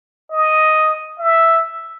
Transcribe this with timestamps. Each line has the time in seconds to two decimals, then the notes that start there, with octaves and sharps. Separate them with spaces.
0.31 D#5
1.19 E5